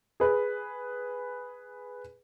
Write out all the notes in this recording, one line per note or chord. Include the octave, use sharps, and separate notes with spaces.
G#4 B4